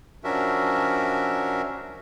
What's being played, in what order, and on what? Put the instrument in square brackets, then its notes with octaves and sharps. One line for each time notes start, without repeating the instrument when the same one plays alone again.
[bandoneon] F3 C#4 D4 F#4 A#4 E5